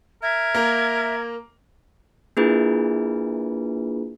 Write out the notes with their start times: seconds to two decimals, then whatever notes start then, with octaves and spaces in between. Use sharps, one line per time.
0.22 A#4 E5 G#6
0.55 A#3 A#5
2.37 A#3 D4 E4 F4 G#4 B4